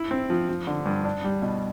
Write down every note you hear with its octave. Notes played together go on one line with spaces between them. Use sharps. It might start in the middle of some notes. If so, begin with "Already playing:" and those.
Already playing: E4
C4
F3
F3
D3
G2
D4
G3
B2